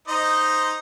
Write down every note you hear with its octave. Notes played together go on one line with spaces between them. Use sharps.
D#4 C5 D#5